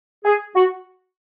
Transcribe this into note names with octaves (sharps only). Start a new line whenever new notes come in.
G#4
F#4